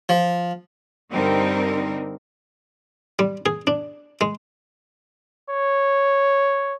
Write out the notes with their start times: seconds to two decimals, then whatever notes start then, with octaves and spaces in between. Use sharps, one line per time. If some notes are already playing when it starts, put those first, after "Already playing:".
0.09 F3
1.11 G2 D3 G3 C4 D#4 A#4
3.19 G3
3.46 G#4
3.67 D4
4.21 G#3
5.50 C#5